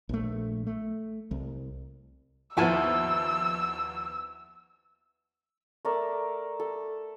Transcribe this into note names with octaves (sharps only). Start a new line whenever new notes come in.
A#1 A3
A3
C2
D#2 F3 B3 E4 G#5 A5 E6
A3 A#4 D5 E5
A4